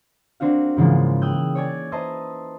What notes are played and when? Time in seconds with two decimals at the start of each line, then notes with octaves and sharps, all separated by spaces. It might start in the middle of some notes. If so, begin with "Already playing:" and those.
0.40 A#3 C4 D4 F#4 F5
0.77 G#2 C#3 E3 F3 G#3 A#3
1.22 G5 D#6 E6 F#6 G6
1.55 C#5 D5 G#5 D6 G#6 A6
1.92 B4 C5 D#5 E5 A5 A#5